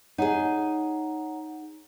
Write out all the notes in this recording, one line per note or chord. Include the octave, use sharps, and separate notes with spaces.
D#4 G#4 C#5 F#5 A#5